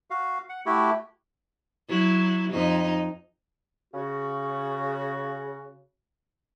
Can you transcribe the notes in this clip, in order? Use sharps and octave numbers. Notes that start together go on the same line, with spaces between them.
F#4 F5
F#5
A3 E4 F#4 G4
F#3 E4
F2 D#4
C#3 F#4